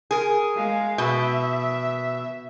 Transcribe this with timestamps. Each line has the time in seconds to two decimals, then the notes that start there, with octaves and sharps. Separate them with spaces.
0.11 G#4 A#4
0.56 G#3 F5
0.98 B2 E5